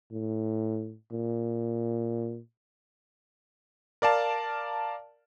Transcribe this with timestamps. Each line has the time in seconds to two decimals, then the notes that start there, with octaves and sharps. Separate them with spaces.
0.11 A2
1.12 A#2
4.02 A#4 D5 F5 A5